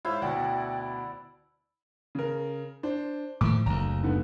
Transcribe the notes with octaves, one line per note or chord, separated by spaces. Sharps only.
G#2 E4 F4 C5 C#5
D2 B2 D5 F#5 G5
C#3 A#4
D4 C5
A2 D#3 F3 D6
F#1 D2 A#5
G#2 D3 B3